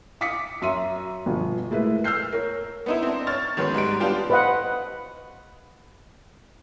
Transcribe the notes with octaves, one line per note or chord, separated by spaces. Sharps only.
F5 D6 D#6 B6 C#7
F#2 E5 C6 D#7
G1 B2 F3
G#3 A3 E4 A#4 B4
E6 F6 G6 C7
A#4 C#5
B3 D#4 E4
C4 D4
C#5 F6 A6
D#3 F#3 G#3 B3 C#4
G#2 G3 G#3 D7
B3 D4 F4 G4
B4 C5 D#5 F5 F#5